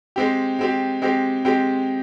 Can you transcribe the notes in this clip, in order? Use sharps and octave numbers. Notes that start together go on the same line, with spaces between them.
G#3 C4 G4
G#3 C4 G4
G#3 C4 G4
G#3 C4 G4